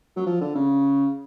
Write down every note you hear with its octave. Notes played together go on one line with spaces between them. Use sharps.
F#3
F3
D3
C#3